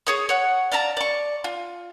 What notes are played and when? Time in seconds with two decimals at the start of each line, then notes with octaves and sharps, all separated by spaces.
0.07 G#4 C#5 D#6
0.29 C#5 F#5
0.72 D5 F5 A5 A#5
0.97 D5 C#6
1.44 F4